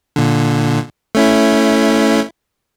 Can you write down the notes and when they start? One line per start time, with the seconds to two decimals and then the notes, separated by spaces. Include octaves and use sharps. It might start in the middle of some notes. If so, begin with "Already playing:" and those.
0.16 A#2 D3
1.15 A3 C#4 E4